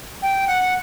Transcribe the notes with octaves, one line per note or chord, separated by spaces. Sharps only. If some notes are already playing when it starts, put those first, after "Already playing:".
G5
F#5